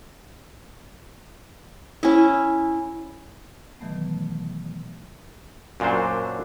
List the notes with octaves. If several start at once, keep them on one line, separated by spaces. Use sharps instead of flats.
C#4 E4
B2 D#3 E3 F#3 A3 B3
F#2 A#2 F#3 D4 C5